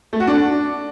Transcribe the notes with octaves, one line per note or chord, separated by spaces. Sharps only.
A3
F#4
D4